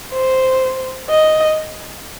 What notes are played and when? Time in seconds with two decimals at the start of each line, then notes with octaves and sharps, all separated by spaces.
0.12 C5
1.10 D#5